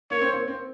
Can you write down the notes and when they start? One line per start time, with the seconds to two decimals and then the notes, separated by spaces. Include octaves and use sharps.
0.11 A#3 C#5
0.21 C4
0.33 A#3
0.48 C4